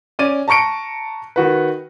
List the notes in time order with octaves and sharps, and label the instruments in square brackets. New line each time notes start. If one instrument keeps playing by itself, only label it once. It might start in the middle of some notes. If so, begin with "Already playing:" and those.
[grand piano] C#4 D5 D#7
A5 A#5 C#6 C#7 D7
D#3 F#4 B4